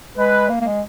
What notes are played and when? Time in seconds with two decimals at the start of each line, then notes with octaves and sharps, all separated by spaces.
0.17 G#3 B4
0.49 A#3
0.61 A#3
0.64 G#3